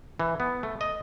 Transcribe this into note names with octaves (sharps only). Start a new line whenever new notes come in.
E3
B3
A3
D#5